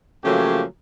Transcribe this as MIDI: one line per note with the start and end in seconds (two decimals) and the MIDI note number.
0.25 0.63 49
0.25 0.63 53
0.25 0.63 54
0.25 0.63 57
0.25 0.63 58
0.25 0.63 67